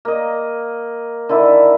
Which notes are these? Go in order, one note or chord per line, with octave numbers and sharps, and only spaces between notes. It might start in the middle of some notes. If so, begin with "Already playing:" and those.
A#3 D#5
D3 D#3 E4